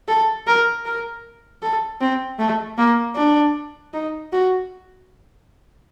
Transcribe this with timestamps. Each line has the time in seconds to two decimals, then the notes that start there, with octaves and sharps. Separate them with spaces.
0.08 A4
0.47 A#4
0.86 A#4
1.63 A4
2.01 C4
2.39 A3
2.78 A#3
3.16 D4
3.94 D#4
4.33 F#4